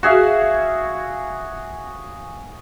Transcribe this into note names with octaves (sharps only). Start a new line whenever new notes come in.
F#4 G#4 E5 F5